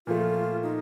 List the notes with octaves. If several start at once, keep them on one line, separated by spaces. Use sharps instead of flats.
A#2 F3 A3 F4
D#4